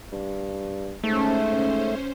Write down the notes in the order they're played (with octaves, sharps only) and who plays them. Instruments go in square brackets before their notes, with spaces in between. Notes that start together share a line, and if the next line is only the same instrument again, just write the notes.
[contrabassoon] G2
[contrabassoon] G#2 [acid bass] A3 [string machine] C#4 C5